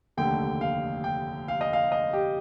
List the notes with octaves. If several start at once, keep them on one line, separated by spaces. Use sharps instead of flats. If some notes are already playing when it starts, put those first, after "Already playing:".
F1 D#2 D3 A3 G5
F5
G5
F5
D#5
F5
D#5
G4